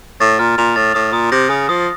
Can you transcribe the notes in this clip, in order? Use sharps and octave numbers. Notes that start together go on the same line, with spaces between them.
A2 A6
A#2 F6
A#2 F7
A2 A6
A2 D#6
A#2 D#6
C3 A#6
C#3 D#6
F3 D#6